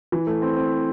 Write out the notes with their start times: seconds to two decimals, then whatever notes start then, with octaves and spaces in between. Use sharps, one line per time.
0.12 E3
0.27 A3
0.42 C4
0.56 C4